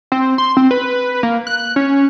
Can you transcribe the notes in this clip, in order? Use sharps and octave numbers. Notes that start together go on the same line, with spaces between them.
C4
C6
C4
B4
A#3
F#6
C#4